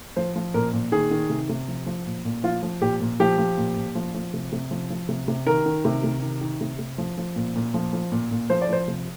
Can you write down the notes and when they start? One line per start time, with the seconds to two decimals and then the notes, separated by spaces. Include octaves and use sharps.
0.16 F3 C5
0.36 F3
0.54 A#2 A#4
0.73 A#2
0.92 D#3 G#4
1.11 D#3
1.30 C3
1.49 C3
1.68 F3
1.86 F3
2.06 A#2
2.25 A#2
2.43 F3 F4
2.63 F3
2.81 A#2 G4
3.00 A#2
3.20 F3 G4
3.38 F3
3.57 A#2
3.76 A#2
3.95 F3
4.14 F3
4.33 C3
4.52 C3
4.71 F3
4.90 F3
5.09 C3
5.28 C3
5.47 D#3 A#4
5.66 D#3
5.85 C3
6.04 C3
6.22 D#3
6.41 D#3
6.61 C3
6.79 C3
6.98 F3
7.18 F3
7.36 A#2
7.56 A#2
7.74 F3
7.93 F3
8.12 A#2
8.31 A#2
8.50 F3 C5
8.62 D5
8.69 F3 C5
8.88 C3